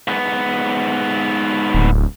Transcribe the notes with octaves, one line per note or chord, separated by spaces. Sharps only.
G#2 B3
D1